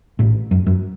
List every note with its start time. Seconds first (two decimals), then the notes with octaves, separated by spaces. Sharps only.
0.19 A1 A2
0.51 F#2
0.67 F#2